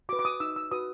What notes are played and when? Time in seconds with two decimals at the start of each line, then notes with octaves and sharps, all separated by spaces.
0.09 F#4 D6
0.13 B4
0.19 D6
0.25 D#6
0.40 D#4 E6
0.56 E6
0.71 F#4 B4 D#6